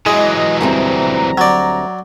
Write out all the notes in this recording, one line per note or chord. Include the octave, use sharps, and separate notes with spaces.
E3 F#3 G#3 D#5
D2 G3 C4 A#5
F#3 D5